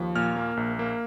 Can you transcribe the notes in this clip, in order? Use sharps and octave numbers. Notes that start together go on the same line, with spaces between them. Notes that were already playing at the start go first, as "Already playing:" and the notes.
Already playing: D#2 F3
A#2 F6
A#3
A#1
A#3